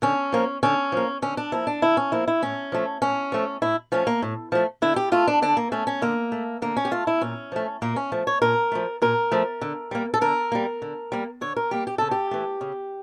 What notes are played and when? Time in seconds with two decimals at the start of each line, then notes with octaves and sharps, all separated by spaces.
0.02 D3 C#4
0.32 F3 A#3
0.63 D3 C#4
0.92 F3 A#3
1.22 D3 C#4
1.37 D4
1.52 F3 A#3 E4
1.67 D4
1.82 D3 E4
1.97 C#4
2.12 F3 A#3 E4
2.28 E4
2.42 A2 C#4
2.72 F3 A3
3.02 A2 C#4
3.32 F3 A3
3.62 A2 E4
3.92 F3 A3 C#4
4.07 A#3
4.22 A2
4.52 F3 A3
4.82 D3 E4
4.96 G4
5.12 A3 F4
5.27 D4
5.42 D3 D4
5.57 A#3
5.72 A3 C#4
5.87 C#4
6.02 D3 A#3
6.32 A3
6.62 D3 A#3
6.77 C#4
6.85 G4
6.91 A3 F4
7.07 E4
7.21 A#2 C#4
7.52 F3 A3
7.82 A#2 A#3
7.96 C#4
8.12 F3 A3
8.27 C#5
8.42 A#2 A#4
8.72 F3 A3
9.02 A#2 A#4
9.31 F3 A3
9.62 D3
9.91 G3 A#3
10.14 A4
10.21 D3 A#4
10.52 G3 A#3
10.82 D3
11.12 G3 A#3
11.41 D3 C#5
11.56 A#4
11.71 G3 A#3 G4
11.87 G4
11.98 C#3 A4
12.11 G4
12.31 E3 A3
12.61 C#3